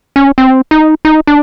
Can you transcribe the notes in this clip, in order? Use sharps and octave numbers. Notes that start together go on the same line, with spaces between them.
C#4
C4
D#4
D#4
D4